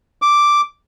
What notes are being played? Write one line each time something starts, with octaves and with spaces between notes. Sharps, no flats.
D6